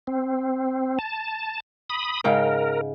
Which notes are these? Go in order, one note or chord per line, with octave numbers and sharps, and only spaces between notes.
C4
A5
B5 D#6
G#2 C#3 A#4 G5